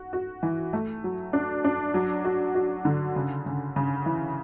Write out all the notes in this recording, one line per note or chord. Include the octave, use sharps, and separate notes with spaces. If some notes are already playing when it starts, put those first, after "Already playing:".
Already playing: F#4
F#4
E3
A3
F#3
D4
D4
F#3
F#4
F#4
D3
C#3
C#3
C#3
E3